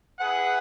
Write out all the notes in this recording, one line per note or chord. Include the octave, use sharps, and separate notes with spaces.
E4 G#4 B4 F#5